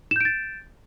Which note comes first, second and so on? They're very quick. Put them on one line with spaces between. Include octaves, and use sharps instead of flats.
E7 G6 D7 A6